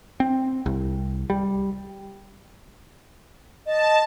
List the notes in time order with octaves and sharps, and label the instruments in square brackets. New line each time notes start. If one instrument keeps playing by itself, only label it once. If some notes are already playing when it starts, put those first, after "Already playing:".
[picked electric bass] C4
C2
G3
[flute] D#5 [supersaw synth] A5